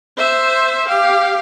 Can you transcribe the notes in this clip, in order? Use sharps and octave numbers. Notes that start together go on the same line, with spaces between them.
C5 E5
G4 F5